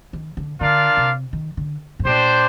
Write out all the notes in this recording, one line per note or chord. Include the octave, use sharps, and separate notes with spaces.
D#3
D3
D3 D4 F4 A#4 D5 F5
C3
D#3
D3
G#2
A#2 D4 G4 C5